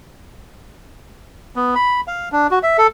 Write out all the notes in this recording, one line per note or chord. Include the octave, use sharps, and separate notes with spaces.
B3
B5
F5
D4
F#4
E5
A4